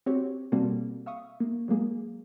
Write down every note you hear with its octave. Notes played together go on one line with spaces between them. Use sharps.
C4 F#4 G4 C#5
B2 G3 A#3 C4 F#4 A4
E5 F5 C#6 D#6
A#3
F#3 G#3 A#3 G#4